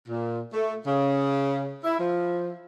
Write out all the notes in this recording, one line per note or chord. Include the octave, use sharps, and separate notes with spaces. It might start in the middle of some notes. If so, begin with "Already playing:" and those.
A#2
A3
C#3
E4
F3